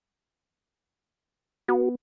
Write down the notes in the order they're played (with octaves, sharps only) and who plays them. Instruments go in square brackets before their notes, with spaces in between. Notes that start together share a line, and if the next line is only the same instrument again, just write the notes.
[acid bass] B3 [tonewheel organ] F#4